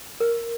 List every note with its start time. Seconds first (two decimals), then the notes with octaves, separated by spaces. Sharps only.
0.20 A#4